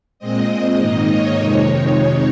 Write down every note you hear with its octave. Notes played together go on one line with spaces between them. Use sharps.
A#2 G#3 C4 D#5
G#2 D#3 A#3 D#4
C#5
F2 C3 D#3 G#3 D#4